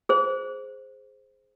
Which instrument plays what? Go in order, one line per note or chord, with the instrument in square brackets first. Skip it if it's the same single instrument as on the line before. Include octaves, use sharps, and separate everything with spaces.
[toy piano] G#4 C5